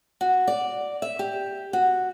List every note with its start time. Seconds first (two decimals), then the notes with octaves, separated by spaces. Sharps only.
0.21 F#4
0.48 D5
1.02 E5
1.19 G4
1.73 F#4